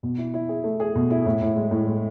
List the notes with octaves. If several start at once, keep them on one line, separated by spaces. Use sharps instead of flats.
B2
E4
E4
G#4
A3
G#4
B2
E4
A2
A2
G#3
A2
G#3